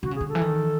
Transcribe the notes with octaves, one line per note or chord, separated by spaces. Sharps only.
D3 F#4
C#3
G#4
D3
A4
E3
D#3